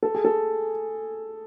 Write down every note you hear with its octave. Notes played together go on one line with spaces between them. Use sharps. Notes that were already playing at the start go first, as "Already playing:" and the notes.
A4
G#4
A4